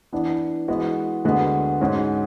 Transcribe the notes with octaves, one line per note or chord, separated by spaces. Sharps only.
E3 B3 D4
E3 G#3 B3 F#4
D2 D3 G#3 B3 F#4
G#2 G#3 C#4 F#4